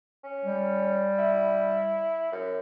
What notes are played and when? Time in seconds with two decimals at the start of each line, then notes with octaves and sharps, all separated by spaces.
0.23 C#4
0.45 G3
1.19 E4
2.32 F#2